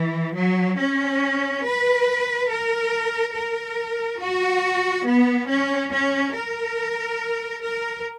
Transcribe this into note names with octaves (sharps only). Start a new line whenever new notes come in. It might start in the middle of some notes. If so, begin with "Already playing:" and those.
Already playing: E3
F#3
C#4
B4
A#4
A#4
F#4
B3
C#4
C#4
A#4
A#4